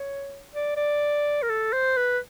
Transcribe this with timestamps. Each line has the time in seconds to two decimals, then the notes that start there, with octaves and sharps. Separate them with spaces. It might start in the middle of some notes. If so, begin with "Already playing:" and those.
Already playing: C#5
0.54 D5
0.77 D5
1.43 A#4
1.49 A4
1.73 C5
1.97 B4